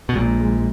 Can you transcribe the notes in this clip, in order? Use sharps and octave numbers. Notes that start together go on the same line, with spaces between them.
B2
A#1 A#2 G#3
G#3